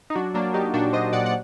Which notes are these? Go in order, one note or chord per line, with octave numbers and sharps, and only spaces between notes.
D#4
F#3 D4 F#4
F#3 A#3 D4
F#3 D#4 G4
A#2 D4 F#4
F#3 C5 D#5
A#2 D5 F#5
F#5